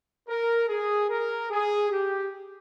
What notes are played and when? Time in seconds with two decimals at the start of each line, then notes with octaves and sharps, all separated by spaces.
0.28 A#4
0.68 G#4
1.10 A#4
1.50 G#4
1.90 G4